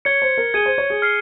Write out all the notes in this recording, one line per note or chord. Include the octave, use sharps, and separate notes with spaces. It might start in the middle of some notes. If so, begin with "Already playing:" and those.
C#5 G#6 C#7 G7
C5
A#4
G#4 G#6 D#7 G7
C5
C#5
G#4
F6 C7 G7